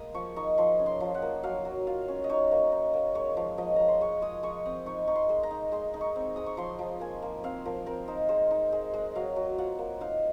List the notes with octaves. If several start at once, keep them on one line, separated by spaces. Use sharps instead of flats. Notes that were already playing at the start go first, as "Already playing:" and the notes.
Already playing: G#3 A#3 D#6
F3 C#6
D#4 C#6
F3 C6
C#4
C6
F3
F#5
A#3
F#3 F5
F#3
F4 F5
C#4
D#5
D#4 C#5
A#3
D#4
A#3
G#3 C#5
F3
F3 D#5
F3 A#5
C6
G#3 C#6
G#3 D#6
G#3 C#6
C4 D#6
D#4 C#6
D#4 C#6
C6
G#3
A#5
D#4
G#3 C6
D#4
C#6
C4
G#3 D#6
C#6
F3 C6
F3
A#3 G#5
A#3
C4 F5
F3 A#4
C4 A#4
D#4 C5
G#3 C5
D#4
G#3
G#3
F#3 F5
F#3
F4 F#5
A#3
D#4 F5